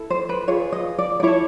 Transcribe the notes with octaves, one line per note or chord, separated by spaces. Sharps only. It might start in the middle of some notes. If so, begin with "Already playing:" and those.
Already playing: E4 A4
C5
B4
F4 G#4 B4 C#5
D#5
D5
D5
E4 A4 C#5